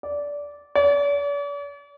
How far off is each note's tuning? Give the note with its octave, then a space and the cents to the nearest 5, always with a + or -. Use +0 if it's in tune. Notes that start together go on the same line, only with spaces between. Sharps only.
D5 -15
D5 -45